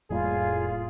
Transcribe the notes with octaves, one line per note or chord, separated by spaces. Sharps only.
F1 A2 G3 A#3 F4 G#4